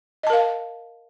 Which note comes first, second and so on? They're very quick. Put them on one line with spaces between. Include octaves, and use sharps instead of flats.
D#5 A5 A#4 F5